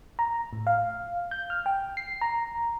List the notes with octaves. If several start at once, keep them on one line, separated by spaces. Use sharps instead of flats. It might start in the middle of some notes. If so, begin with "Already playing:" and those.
A#5
A2
F5
G6
F6
G5
C7
A#5